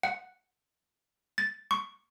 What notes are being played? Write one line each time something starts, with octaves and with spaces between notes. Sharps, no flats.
F#5
A6
C#6